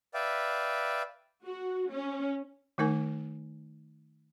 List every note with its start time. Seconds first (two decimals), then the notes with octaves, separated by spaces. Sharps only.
0.14 B4 D5 E5 F5 G5
1.45 F#4
1.92 C#4
2.78 D#3 A3 D#4 A#4 G#5